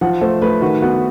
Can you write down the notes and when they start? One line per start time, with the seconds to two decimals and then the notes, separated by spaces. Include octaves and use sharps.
0.01 F3 F#5
0.21 A3 C5
0.42 A3 B4
0.62 D#3 F#4
0.82 B3 F#4